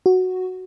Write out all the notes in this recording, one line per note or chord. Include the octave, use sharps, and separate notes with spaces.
F#4